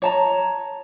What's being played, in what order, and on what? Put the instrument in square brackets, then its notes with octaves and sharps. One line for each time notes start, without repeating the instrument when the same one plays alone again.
[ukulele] C#5 A5 A#5